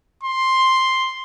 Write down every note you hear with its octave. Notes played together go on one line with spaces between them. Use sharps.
C6